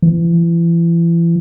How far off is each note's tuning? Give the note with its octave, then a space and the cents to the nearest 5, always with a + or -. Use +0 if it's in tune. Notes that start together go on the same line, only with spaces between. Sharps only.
E3 +35